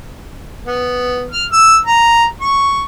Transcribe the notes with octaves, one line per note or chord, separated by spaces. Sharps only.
B3
F6
E6
A#5
C#6